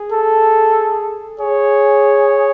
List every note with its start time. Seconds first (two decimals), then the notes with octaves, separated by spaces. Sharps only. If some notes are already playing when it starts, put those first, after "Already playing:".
Already playing: G#4
0.12 A4
1.40 G#4 C#5